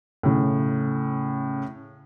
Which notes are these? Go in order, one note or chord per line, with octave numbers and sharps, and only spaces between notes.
A2 C#3